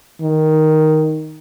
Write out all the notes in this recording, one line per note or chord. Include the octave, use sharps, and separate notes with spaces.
D#3